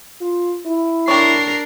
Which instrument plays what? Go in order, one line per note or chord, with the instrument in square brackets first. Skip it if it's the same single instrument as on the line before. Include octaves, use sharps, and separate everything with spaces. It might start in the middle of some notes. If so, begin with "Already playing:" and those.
[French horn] F4
E4
[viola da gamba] D4 A#4 [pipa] G4 C#5 [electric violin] C7